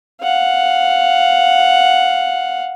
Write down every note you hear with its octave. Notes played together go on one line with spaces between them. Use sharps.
F5 F#5